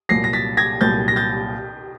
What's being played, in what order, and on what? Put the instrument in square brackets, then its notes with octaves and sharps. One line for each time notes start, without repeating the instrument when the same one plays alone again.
[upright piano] C2 A#2 F#3 [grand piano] A#6 C7
[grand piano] A#6
A6 B6
G#6 A#6
[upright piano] C2 A#2 F#3 [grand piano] G6 A6
[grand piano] A#6
G6 A6